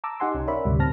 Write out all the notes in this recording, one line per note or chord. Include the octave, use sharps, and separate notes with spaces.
A5 A#5 D6 E6
D#4 G4 F#5 G#5 C6
C2 C#4
A#4 C#5 D5 E5 B5
D2 G#2 C3 G3
A2 C4 A5 F6 A#6